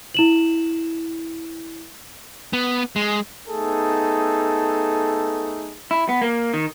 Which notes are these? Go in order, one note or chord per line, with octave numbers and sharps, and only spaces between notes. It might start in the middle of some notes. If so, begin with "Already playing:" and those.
E4 E7 F#7
B3
G#3
A3 B3 D#4 G#4 A4
E4
B3
A#3
D#3